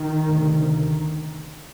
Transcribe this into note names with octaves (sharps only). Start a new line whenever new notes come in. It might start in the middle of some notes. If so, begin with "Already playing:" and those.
Already playing: D#3
D2 C3